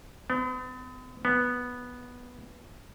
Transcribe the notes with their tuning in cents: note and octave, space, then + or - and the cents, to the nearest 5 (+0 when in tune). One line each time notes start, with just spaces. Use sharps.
B3 +45
B3 -5